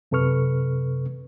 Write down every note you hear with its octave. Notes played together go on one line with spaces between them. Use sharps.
F#2 C3 A4 B4 C#6 F6